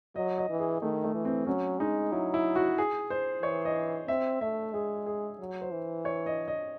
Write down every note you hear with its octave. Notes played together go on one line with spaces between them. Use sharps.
F#3 D#5
D#5
E3
G#4
D#3 A3
A3
E3
C4
F#3 C#4
G#3 D#4
F#3 E4
E4
F#4
G#4
C5
E3 C#5
D#5
C4 E5
A3 E5
G#3 G#4
G#4
F#3
C5
E3
C#5
D#5
D#5